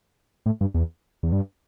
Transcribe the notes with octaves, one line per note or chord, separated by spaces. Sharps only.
A2
G2
E2
E2
G2